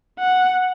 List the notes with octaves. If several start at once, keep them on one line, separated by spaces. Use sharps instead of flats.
F#5